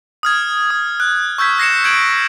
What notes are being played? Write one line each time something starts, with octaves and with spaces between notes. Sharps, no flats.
D#6 F6 G#6
D#6
F#6
C#6 E6 G6 G#6 B6
G#6 A#6 C7 C#7 E7
G6 G#6 D7 F#7